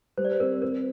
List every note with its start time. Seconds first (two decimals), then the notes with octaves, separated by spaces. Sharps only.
0.18 G3 C5
0.25 D5
0.32 C5
0.40 C4 A#4
0.62 C4 A#4